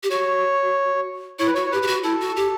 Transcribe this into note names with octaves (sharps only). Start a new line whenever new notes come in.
G4
F#4 C#5
E4 C#5
B4
F#4 C#5
C#5
G4 B4
G4
F#4
E4 A4
F#4
G4